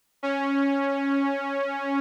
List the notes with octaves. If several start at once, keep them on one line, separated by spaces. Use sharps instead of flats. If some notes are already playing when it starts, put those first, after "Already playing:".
C#4